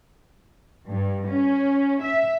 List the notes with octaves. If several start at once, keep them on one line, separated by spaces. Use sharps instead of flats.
G2
C#4
E5